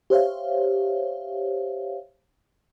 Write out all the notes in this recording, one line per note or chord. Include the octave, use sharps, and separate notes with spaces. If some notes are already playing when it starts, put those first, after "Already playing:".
G4 C5 C#5 E5 F5